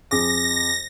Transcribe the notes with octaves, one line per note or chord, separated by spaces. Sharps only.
F2 G#4 D6 A#6